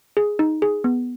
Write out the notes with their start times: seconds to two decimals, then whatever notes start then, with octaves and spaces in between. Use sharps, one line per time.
0.17 G#4
0.39 D#4
0.62 G#4
0.84 B3